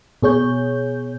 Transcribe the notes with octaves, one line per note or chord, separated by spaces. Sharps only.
B2 G#4 C#5 G6